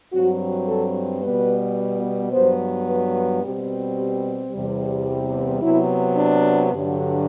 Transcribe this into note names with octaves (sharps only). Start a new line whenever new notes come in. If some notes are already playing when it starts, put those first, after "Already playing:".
G2 F#3 C4 F#4
A4
B2 G3 B3 B4
G2 F#3 B3 C5
B4
B2 G3 C4 G4
G4
E2 C3 G3
C3 F#3 B3 E4
D4
G2 D3 F#3